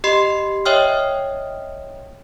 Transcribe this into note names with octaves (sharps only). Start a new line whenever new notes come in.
G4 D#5 B5 C6 C7
C#5 D#5 E5 G5 D#6 F6